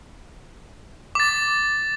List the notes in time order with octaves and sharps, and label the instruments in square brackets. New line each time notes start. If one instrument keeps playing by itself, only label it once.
[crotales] D6 A6